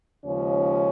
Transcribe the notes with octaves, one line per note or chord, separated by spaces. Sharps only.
D#2 C#3 F3 G#3 C#4